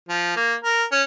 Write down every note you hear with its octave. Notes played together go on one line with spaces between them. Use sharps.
F3
A#3
A#4
C#4